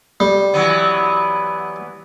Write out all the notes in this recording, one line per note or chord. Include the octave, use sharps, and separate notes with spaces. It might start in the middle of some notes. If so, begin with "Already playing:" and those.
G3
E3 F#3 B3